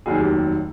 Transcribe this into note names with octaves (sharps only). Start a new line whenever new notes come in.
F1 D#2 D#3 F#3 G#4
G4